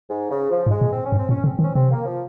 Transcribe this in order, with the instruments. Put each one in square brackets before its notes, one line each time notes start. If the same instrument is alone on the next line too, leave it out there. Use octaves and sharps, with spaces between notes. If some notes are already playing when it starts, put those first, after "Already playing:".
[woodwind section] G#2
C#3
F3
[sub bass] G#2
[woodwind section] G#3
[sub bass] A#2
[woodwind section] C4
C#4
[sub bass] G2
[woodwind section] C4
[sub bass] A#2 [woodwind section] C#4
[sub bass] C#3 [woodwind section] C4
[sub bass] D#3
[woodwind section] C#4
[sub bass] C3 [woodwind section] C4
[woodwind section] A#3
F3